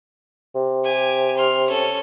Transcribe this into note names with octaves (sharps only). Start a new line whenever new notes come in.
C3
G4 G#5
C6 F6
C#4 A4